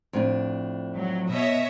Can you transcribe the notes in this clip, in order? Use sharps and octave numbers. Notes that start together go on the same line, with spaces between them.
F2 A2 D4
F#3
B2 C#5 D#5 E5